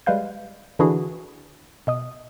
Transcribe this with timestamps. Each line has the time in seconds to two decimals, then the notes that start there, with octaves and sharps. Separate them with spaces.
0.06 G3 G#3 B4 F5 G6
0.79 D3 E3 D4 E4 F#4 G#4
1.87 B2 D#5 D#6